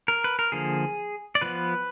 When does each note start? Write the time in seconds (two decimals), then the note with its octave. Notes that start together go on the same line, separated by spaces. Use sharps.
0.08 A#4
0.24 B4
0.39 A#4
0.52 D3 F3 A#3 G#4
1.35 D5
1.42 F3 B3 B4